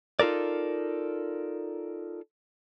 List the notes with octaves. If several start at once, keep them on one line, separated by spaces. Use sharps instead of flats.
D#4 F4 A4 A#4 D5